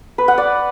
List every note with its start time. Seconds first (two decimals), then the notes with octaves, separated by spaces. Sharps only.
0.18 B4
0.28 F#5
0.38 D5